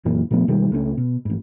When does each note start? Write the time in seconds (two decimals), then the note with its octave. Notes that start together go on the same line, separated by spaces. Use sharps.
0.05 F#2 A#2 E3
0.31 A#2 F3 A3 B3
0.48 B2 D#3 G3 G#3
0.72 C#2 A3 C4 C#4
0.97 B2
1.25 A1 G#2